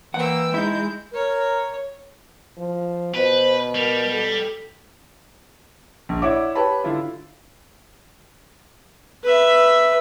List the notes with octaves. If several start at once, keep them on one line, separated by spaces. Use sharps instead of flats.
E3 A#3 F#5 G5 E6
G#3 D#4 E4 G6
A#4 C#5
F3
B2 B4 C5
G3 A#4
A4
A#1
E4 C#5 D5 E5 F#5 D6
G4 B4 C#5 A5 B5
D3 E4 F4
B4 E5